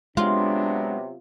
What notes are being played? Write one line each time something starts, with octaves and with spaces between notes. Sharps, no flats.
C3 F#3 G#3 B3 D4 F4